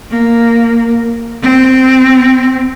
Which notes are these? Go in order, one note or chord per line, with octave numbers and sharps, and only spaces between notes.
A#3
C4